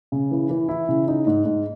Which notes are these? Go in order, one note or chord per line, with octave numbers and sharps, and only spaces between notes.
C#3
E3
E3
E4
C#3
D#4
G#2
G#2